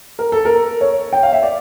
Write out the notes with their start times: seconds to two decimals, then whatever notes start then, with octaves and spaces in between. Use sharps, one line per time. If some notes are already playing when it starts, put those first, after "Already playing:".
0.19 A#4
0.32 A4
0.45 A#4
0.81 C#5
1.13 G5
1.23 F5
1.33 E5
1.43 D5